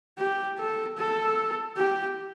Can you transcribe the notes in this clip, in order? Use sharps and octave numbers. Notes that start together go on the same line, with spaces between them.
G4
A4
A4
G4